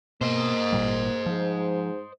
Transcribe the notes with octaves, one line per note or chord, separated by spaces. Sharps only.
B2 A#3 C5 D#5
G#1 A#2 G3
G#2 F3